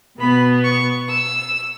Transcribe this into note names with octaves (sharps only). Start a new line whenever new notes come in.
B2 B3 B5
C#6
E6